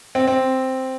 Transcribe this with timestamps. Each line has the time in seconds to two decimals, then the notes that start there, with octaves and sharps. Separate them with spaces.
0.15 C4
0.28 C4